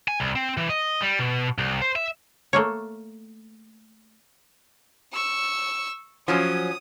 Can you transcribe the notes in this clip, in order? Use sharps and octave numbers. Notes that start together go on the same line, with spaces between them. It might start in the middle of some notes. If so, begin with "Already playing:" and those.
G#5
C2
C4
E3
D#5
G3
B2
C2
C5
E5
A3 A#3 C#5
C#6 E6
F3 F#3 C#4 D#6